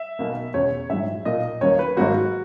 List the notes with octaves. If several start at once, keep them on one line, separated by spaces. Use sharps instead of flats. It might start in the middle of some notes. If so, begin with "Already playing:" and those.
Already playing: E5
B1 B2 A#3
E1 E2 C#3 C#5
A#1 G#2 F#3 E5
B1 A#2 A#3 D#5
D#2 C#3 F#3 A#3 C#5
B4
G#1 G#2 F#3 A#3 F#4